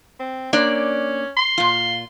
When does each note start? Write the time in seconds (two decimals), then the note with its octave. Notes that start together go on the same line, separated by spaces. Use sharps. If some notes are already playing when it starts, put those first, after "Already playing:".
0.19 C4
0.53 A#3 C#4 D4 D5
1.37 C6
1.58 A#2 F4